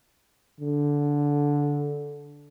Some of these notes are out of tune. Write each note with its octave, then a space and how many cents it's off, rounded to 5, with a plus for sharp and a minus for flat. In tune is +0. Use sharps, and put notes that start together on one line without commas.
D3 -15